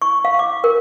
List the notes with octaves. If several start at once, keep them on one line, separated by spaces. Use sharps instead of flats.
C#6
F5
D6
A#4